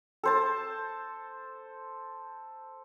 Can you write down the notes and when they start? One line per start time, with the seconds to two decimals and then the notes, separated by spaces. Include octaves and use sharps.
0.23 A4 C5 A5